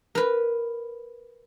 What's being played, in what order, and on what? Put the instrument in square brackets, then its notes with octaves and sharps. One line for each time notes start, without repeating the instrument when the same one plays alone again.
[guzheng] A#4 B4